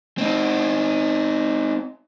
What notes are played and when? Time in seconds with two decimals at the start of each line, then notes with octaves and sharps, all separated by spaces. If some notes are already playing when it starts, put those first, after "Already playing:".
0.18 C4 D#4